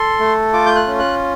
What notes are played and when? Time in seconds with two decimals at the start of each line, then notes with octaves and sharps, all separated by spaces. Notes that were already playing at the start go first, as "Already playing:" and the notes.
Already playing: A4 C6
0.20 A3
0.53 F4 D6
0.66 G6
0.75 F#6
0.87 C#4
0.99 F#6